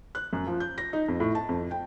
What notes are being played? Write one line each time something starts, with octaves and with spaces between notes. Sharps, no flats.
F#6
F#2
F3
G6
A#6
D#4
F2
A2
A5
F2
G5